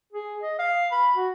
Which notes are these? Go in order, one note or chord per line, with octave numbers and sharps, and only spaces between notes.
G#4
D#5
F5
B5
F#4